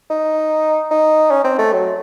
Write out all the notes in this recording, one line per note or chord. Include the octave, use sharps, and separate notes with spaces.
D#4
D#4
C#4
C4
A3
F#3